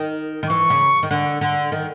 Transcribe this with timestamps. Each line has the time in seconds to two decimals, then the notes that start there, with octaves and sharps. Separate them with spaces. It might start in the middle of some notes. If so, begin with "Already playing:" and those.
Already playing: D#3
0.43 D#3
0.50 E3 C#6
0.70 C#3
1.03 D#3
1.11 D3
1.41 D3
1.72 D#3